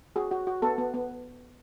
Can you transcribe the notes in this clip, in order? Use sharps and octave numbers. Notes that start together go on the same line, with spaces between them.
F#4 G#4
F#4
F#4
B3 A4
B3
B3